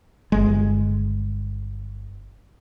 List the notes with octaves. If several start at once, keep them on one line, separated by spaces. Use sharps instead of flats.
G1 G#3